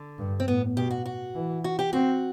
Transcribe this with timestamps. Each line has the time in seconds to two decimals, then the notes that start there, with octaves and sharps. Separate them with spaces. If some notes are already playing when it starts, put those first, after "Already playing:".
Already playing: D3
0.18 G2
0.40 C4
0.47 A2 B3
0.76 B2 G4
0.91 F#4
1.06 F#4
1.35 E3
1.64 F#4
1.79 G4
1.93 C4 F#4